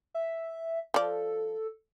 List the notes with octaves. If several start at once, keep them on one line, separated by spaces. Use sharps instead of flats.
E5
F3 A4 D5